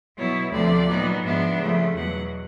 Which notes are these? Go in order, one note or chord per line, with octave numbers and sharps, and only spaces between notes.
B2 F#3 B3 E4 C#5
D2 C3 F3 A3 D5
A#2 F#3 B3 D#4
G#2 F3 G#3 B3 D4 E5
C#3 F3 A3
E2 B2 F#3 F#5